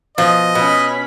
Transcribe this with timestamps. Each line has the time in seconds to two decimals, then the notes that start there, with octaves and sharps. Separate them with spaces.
0.18 B2 F3 D#5
0.55 B2 C#4 B5